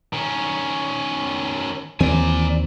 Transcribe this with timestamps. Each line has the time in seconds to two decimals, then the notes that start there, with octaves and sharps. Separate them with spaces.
0.13 D#3 C#4
2.00 D#2 E3 C4 D5 G#5